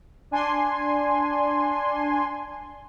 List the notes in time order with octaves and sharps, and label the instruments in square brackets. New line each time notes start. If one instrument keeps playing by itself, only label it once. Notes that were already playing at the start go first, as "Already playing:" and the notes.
[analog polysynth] D4 G#5 C6